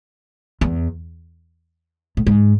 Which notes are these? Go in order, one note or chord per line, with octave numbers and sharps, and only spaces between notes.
E2
A2
G#2